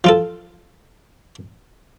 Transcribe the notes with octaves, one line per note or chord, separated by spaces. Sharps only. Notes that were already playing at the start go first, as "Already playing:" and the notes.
F3 F4 A4